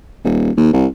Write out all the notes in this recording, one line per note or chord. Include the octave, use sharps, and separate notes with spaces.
D#1
D#2
C2